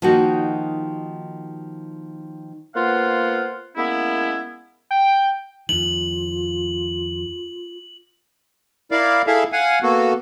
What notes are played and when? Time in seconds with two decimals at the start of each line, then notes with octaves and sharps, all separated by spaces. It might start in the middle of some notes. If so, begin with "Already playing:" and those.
0.02 D#3 F3 A#3 D#4 F#4
2.75 A#3 B3 F4 C5 F5 F#5
3.77 G#3 A#3 B3 C#4 E4
4.91 G5
5.69 F2 D#3 F4 F#7
8.91 E4 A#4 D5 F5
9.27 E4 G#4 A4 E5 F5
9.53 F5 F#5 G#5
9.83 A#3 B3 F#4 A4